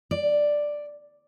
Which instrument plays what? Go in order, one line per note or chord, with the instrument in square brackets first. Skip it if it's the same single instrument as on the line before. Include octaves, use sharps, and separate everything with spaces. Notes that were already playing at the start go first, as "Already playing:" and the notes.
[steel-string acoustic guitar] D5